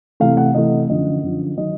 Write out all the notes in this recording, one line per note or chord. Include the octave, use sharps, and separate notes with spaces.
C3 E3 A3 F5
F#5
C3 E3 A3 D#5
F#2 D3 F3 D#5
F#2 D3 F3
D#3 F#3 D#5